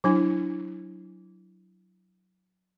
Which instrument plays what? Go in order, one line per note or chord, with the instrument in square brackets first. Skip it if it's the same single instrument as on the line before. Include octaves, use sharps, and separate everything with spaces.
[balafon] F#3 D4 E4